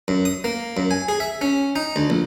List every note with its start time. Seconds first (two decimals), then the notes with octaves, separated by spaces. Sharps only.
0.08 F#2
0.25 D#6
0.44 A#3
0.77 F#2
0.91 G#5
1.08 G#4
1.20 E5
1.41 C#4
1.76 D#4
1.96 D2
2.10 A#1